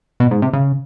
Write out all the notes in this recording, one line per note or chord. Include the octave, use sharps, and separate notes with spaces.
B2
G#2
C3
C#3